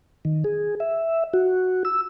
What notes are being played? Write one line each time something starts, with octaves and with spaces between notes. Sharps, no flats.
D#3
G#4
E5
F#4
E6